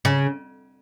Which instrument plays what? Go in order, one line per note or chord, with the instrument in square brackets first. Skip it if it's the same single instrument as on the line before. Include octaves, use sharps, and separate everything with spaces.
[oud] C#3